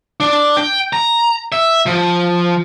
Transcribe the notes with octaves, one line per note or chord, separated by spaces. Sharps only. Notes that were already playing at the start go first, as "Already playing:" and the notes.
D4
G5
A#5
E5
F3